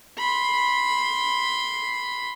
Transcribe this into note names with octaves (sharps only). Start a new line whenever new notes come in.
B5 C6